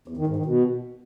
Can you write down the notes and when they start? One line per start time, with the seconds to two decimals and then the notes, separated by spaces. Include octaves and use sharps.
0.08 E2
0.17 D#3
0.27 G#2
0.36 D#3
0.46 B2